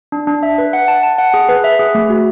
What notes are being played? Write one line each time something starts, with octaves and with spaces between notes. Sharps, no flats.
D4
D4
E5
B4
F#5
A5
A5
F#5
G#4
B4
E5
G#4
A3
F#4